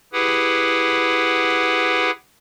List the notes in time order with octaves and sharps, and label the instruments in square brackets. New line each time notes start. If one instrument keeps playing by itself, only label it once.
[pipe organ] E4 G4 G#4 B4 F#5